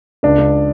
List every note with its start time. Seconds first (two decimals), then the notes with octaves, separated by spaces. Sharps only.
0.23 C#2 D4
0.38 C#2